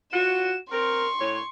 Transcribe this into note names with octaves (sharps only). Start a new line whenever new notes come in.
F4 F#4 E7
C4 A#4 C6 C#6
A2 C#5